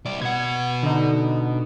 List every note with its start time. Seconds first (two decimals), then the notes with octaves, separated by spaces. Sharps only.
0.05 C2 D5
0.21 B2 F#5 G#6
0.83 D3 D#4